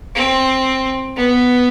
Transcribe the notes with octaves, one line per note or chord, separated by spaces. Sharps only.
C4
B3